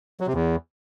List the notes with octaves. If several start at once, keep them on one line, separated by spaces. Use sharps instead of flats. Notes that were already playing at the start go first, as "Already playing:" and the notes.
F#3
C3
E2